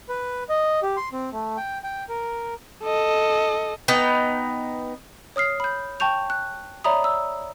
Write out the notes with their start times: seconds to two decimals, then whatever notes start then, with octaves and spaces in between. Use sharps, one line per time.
0.09 B4
0.49 D#5
0.82 G4
0.97 C6
1.13 C4
1.32 A3
1.57 G5
1.84 G5
2.09 A#4
2.84 A4 D#5
3.88 B3 D#4 G5
5.36 C#5 D#6 F6 C7
5.60 B5 G6
6.00 G5 A5 C#6 G6 F7
6.30 F#6
6.84 C#5 D5 E5 A#5 B5 D#6
7.04 E6